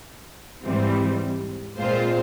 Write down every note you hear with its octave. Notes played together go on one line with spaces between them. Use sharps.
G#2 E3 G3 C4
A#2 G#3 C4 F4 C5